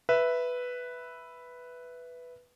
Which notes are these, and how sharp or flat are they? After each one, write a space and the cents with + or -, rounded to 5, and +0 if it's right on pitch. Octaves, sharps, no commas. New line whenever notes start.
B4 +0 E5 +0